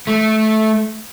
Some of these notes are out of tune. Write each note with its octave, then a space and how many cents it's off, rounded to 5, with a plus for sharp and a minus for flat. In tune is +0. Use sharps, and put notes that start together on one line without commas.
A3 -15